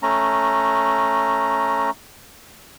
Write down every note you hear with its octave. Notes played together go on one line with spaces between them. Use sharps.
A3 C#4 A#5